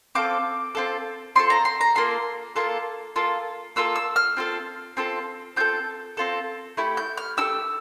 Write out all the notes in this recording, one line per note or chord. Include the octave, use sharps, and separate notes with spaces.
C4 F4 A4 D6
C4 F4 A4
C4 F4 A4 C6
A#5
C6
A#5
A#3 F4 A4 C6
A#3 F4 A4
A#3 F4 A4
A#3 F4 A4 E6
E6
F6
C4 F4 A4
C4 F4 A4
C4 F4 A4 G6
C4 F4 A4
A3 E4 G4
G6
F6
A3 E4 G4 E6